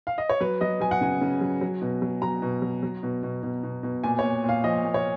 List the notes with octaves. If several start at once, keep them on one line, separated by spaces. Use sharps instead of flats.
F5
D#5
C#5
F#3 B4
F#3 D#5
F#3 G#5
F#5
C#3 G#5
C#3
F#3
F#3
B2
F#3
F#3 A#5
B2
F#3
F#3
B2
B2
B2
B2
B2
A#2 G#5
A#2 C#5
A#2 F5
F3 D#5
A#2
C#5